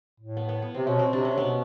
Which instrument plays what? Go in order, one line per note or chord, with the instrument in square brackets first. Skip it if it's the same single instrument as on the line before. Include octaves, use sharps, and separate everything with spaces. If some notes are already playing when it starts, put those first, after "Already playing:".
[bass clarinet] A2
[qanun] B3
B3
B3
[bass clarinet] C3 [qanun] C4
[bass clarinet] B2 [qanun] C#4
[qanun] C4
[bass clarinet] C3 [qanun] D4
[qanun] C#4
[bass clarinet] B2 [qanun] B3